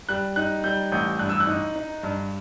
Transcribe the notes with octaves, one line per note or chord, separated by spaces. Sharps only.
G3 F#6
D#4 F#6
G3 G6
A1 G6
G2 F#6
E6
F#6
D#4
D#4
G2